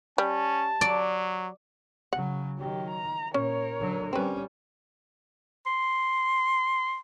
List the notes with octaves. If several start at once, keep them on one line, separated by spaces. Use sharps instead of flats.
G3 C#4 A5
F#3 D5
C#3 F#3 F#5
D#3 F#3 G4
A#5
A#2 C#4 A#4 C#5
D3 F#3
G3 C4 C#4 B4
C6